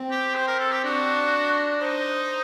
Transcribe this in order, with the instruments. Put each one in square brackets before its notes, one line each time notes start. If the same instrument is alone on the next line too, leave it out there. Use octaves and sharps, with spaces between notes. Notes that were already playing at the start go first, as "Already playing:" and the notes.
Already playing: [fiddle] C4
[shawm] G4
C5
A#4
A4
G4
[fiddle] D4 [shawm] F#4
[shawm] D#4 [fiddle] C5